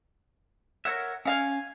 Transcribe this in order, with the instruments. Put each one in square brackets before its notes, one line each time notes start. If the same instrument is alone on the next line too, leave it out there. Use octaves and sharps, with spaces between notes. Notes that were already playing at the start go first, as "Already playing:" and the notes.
[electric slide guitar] A#4 C#5 E5 [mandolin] F#5
[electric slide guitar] C#4 [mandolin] E5 F5 G#5